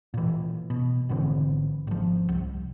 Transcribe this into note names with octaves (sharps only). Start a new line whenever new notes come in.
A#2 E3
B2
G#1 D3 E3 C4
G#1 F3
C2